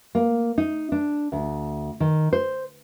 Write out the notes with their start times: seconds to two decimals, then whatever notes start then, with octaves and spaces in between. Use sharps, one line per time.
0.15 A#3
0.58 D#4
0.92 D4
1.32 D2
2.00 D#3
2.33 C5